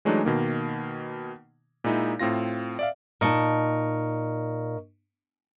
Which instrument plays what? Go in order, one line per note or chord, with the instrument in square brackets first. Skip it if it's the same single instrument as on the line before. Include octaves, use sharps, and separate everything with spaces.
[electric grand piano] E3 F#3 G#3 A3 D4 D#4
B2 D#3 A#3
A#2 G#3 D#4 E4
A2 C4 F4 A#6
D5 E5 F5
[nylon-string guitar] A#2 D#4 A5 [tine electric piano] A#4 D#5 C#6